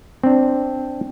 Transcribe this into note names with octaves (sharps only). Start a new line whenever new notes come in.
C4 D4